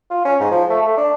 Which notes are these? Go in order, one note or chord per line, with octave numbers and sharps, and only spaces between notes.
F4
C#4
G#2
F3
A3
A3
D4